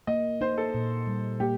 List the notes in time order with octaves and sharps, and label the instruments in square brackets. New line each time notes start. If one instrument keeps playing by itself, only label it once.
[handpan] A#3 [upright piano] D#5
[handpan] D#4 [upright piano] C5
[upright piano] A4
[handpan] A#2
G3
[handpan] A#3 [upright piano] G4